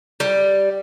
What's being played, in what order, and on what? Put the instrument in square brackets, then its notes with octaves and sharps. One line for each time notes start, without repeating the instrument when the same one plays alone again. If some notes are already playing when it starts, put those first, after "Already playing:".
[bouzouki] G3